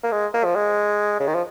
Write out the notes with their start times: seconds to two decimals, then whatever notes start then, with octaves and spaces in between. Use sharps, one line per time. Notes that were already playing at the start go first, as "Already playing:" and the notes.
0.03 A#3
0.12 G#3
0.34 A#3
0.44 F3
0.55 G#3
1.20 C#3
1.27 D#3
1.35 F3